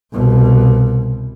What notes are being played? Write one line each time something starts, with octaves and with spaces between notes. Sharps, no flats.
C2 B2